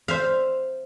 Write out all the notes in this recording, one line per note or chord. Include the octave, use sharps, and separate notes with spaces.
C5 E5 F5